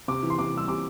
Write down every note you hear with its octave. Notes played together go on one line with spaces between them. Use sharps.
C3 D6
E3
C6
C3 D6
G3 E6
C3 D6